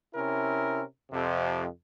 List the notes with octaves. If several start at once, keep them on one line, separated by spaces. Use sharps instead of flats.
C3 C#4 E4 A#4
F2 C3